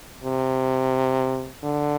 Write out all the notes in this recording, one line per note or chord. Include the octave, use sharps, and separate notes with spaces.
C3
D3